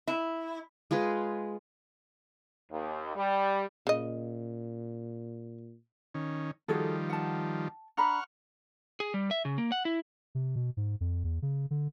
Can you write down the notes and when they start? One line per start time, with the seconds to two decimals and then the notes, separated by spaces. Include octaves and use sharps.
0.07 E4
0.91 G#3 F4 G#4 B4
2.72 D#2
3.16 G3
3.87 A#2 C#3 D#5
6.14 D#3 C#4
6.68 D#3 F3 G3 F#4 G#4 A4
7.10 F#5 A5
7.97 D4 F#5 A#5 B5 C#6 F6
9.00 G#4
9.14 G3
9.31 E5
9.45 C#3
9.58 A#3
9.72 F#5
9.85 E4
10.35 C3
10.56 B2
10.77 G#2
11.01 F2
11.24 E2
11.42 C#3
11.71 D3